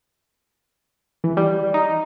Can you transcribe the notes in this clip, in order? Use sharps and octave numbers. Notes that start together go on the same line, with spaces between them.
E3
G3
D#4